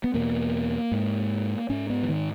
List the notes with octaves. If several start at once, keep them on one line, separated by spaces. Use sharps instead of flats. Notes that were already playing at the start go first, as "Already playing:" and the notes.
B3
E2 B2 A#3
G#2
G#2 C#4
B3
E3
D#3